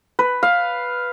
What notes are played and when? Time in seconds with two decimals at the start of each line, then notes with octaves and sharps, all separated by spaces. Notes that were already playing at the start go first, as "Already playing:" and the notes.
0.19 B4
0.43 F5